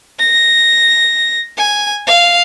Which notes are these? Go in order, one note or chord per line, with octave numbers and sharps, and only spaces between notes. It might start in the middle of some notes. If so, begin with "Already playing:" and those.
A#6
G#5
F5